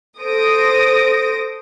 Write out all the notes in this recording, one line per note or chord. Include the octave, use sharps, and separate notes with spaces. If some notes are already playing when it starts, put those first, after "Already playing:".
A4 C5 D#6 A#6 D7